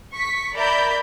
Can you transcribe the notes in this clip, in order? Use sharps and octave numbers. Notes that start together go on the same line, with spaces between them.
C#6 B6
A#4 D5 E5 A#5 B5 G6